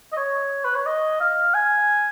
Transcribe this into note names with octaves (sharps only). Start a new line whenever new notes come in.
D#5
C#5
B4
C#5
D#5
F5
G#5